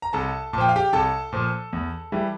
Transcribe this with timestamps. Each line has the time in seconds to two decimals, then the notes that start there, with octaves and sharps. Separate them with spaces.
0.02 A#5
0.13 C2 A4 A5
0.53 A#2 A5
0.58 F3 G5
0.69 F5
0.76 G4 G5
0.93 C2 A4 A5
1.33 A#2 F3
1.73 E2
2.12 E3 G3